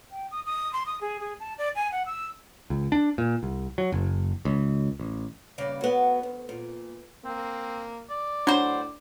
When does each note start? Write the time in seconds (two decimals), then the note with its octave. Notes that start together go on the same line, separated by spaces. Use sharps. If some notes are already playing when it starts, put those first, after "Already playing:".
0.11 G5
0.31 D#6
0.46 D#6
0.73 C6
0.86 D#6
1.01 G#4
1.20 G#4
1.40 A5
1.58 D5
1.76 G#5
1.92 F#5
2.06 E6
2.70 C#2
2.92 D4
3.18 A#2
3.43 C2
3.78 F#3
3.92 F#1
4.45 C#2
5.00 A1
5.58 G2 C#3 A#3 D5
5.81 F#3 B3
6.23 D2
6.49 A#2
7.25 A#3 C4
8.10 D5
8.47 A2 F#3 D4 C5